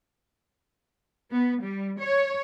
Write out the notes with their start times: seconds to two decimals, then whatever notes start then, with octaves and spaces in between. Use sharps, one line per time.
1.32 B3
1.62 G3
2.01 C#5